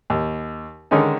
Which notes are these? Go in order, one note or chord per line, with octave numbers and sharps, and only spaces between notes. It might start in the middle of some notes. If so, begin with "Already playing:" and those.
D#2
D3 D#3 G#3 C#4 D#4